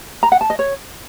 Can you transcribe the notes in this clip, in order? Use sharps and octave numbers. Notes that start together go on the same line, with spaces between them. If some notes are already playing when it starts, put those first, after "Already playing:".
A#5
F#5
A5
D#5
C#5